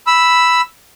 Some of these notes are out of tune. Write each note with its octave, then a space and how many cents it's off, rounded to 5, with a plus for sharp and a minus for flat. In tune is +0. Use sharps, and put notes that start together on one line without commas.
B5 +0 E6 +0